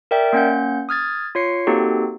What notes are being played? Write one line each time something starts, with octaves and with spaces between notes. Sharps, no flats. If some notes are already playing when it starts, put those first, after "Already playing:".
A#4 D5 E5 G5
A#3 C#4 F#5 G6
D#6 F6 G#6 A6
F4 C#5 C7 C#7
A#3 C4 D#4 F#4 G4 A4